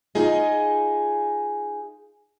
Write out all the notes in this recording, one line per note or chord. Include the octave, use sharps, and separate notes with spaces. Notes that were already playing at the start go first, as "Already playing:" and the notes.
D#4 F4 G#4 D#5